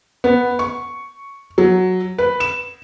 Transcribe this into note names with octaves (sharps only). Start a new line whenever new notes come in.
B3
C#6
F#3
B4
E7